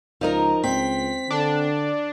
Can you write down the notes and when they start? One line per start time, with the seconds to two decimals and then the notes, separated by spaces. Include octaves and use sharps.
0.21 C#2 F3 D#4 A#4
0.64 C#2 C4 B6
1.30 D3 D4